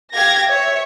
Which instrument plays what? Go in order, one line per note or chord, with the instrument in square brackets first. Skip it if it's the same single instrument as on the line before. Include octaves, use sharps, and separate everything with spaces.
[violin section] G4 F5 G#6 A#6
C#5 E5